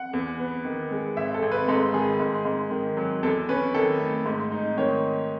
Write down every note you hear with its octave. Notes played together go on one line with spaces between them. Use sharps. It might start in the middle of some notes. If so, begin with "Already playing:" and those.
Already playing: F#5
E2
B3
D#3
G#3
G#1 E5
A4
G#1
B4
G#2 A4
D#3 G#4
G#2
G#2
D#3
F#3
E2 A4
C#4 B4
D#3 A4
A3
G#2
D#4
D#3 C#5